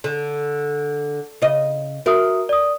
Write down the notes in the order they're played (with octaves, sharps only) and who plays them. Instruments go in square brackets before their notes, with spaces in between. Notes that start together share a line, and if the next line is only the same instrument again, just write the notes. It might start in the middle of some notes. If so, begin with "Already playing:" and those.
[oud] D3
C#3 D#5
[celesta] F#4 E5 D#6 [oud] A#4
[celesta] D5 D#6